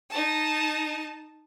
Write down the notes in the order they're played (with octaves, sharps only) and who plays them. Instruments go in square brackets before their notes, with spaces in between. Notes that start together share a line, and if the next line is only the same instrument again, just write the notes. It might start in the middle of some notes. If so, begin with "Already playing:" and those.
[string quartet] D#4 A5